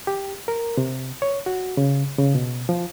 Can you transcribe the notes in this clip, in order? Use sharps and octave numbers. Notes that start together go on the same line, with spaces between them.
G4
A#4
C3
C#5
F#4
C#3
C#3
B2
F3